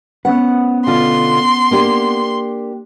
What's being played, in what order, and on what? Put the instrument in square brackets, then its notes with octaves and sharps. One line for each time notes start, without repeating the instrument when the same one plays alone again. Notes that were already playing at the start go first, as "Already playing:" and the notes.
[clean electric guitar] B3 C#4 B4 [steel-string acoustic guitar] F#5
[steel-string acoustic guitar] B2 D3 F4 [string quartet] C6
[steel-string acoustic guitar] A#3 D4 G4